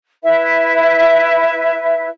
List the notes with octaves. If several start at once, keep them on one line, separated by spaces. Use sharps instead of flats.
E4 B4 E5